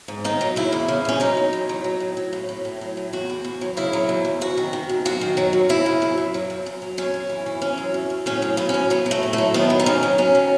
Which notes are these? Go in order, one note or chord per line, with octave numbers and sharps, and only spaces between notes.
G#2
D#3 D#4
F#3
C#3 E4
E2
C#3
E2 C#4
F#3 D#4
F#3
E2
F#3
F#3
A2
F#3
A2
A2
A2
F#3
A2
E2 F#4
E2
E2
F#3
C#3 E4
F#3
E2
E2
F#2 F#4
D#3
D#3
F#2
F#2 F#4
D#3
F#3
F#2
F#2 E4
C#3
F#2
F#2
F#3
F#2
F#2
F#3
F#2 C#4
F#2
E3
E3
E3 C#4
F#2
F#2
F#2
A2 C#4
F#3
A2 B3
C#4
F#3
F#3 B3
F#3
A3
A2
A3
F#3
D#3 B3
F#2
D#4
D#3 C#4
F#3
F#2 C#4
D#3